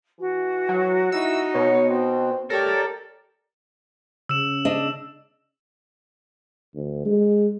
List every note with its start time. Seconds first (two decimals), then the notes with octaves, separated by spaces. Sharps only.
0.20 E3 F#4
0.69 F#3
1.12 D#4 E4 E6
1.55 B2 C#5
1.90 C4
2.50 A3 G4 A4 A#4 C#5 D5
4.29 C#3 E6 E7
4.65 D4 D#5
6.75 D2
7.05 G#3